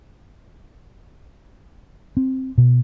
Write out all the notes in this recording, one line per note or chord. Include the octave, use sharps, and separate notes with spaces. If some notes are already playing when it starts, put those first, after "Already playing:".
C4
B2